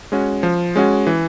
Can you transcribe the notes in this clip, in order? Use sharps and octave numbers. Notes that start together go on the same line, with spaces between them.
G#3 C#4 F#4
F3
G#3 C#4 F#4
E3